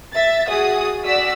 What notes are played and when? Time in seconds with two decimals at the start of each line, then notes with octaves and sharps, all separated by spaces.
0.13 E5 A6
0.48 F#4 G#4 D#6
1.02 F#4 D5 E6 B6